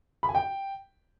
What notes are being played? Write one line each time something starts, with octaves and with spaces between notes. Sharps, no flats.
B5
G#5
G5